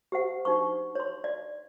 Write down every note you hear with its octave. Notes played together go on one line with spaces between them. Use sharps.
G4 C5 F#5
D4 D#4 C5 C#6
C#5 C6
D5